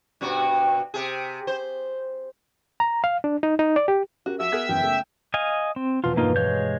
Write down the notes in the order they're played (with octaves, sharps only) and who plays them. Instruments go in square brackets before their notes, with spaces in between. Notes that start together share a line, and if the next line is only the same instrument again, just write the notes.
[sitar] G2 B2 F#4
C3 G#4
C5
[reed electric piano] A#5
F5
D4
D#4
D#4
D5
G4
[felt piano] C#4 G4 A#4 [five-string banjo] F#4
[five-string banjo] F3 [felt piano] F#4 [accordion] E5 E6
[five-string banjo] B3 G#4 A#4 [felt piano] F#6 G#6 B6
[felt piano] E1 F#2 E3 [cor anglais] G5
[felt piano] C#3 A3
[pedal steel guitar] D#5 F5 G#5
C4
[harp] F1 E2 B2 [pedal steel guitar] F4
[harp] G2 [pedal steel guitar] A#3 D#4 F4
[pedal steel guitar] G#3 C#5 G6 [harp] F5